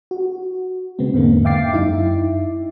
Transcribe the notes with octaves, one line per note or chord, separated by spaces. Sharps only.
F#4
C#3 G#3 B3 C4
E2 G#2 D3 A#3
E5 F5 G5 D6 A6 C7
F#2 D#4 E4 E5